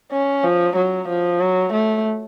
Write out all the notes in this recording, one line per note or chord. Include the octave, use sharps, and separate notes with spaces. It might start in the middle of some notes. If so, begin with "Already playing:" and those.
C#4
F3
F#3
F3
F#3
A3